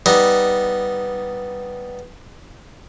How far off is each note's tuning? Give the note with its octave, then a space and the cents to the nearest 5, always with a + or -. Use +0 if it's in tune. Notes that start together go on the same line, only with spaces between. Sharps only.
G3 +0 B3 +0 D#4 +0